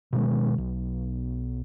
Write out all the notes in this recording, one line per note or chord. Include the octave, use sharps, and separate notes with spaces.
B2 D#3 G#3
B1